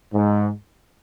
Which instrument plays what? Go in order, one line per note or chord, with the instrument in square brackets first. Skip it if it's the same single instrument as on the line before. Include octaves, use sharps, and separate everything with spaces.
[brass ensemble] G#2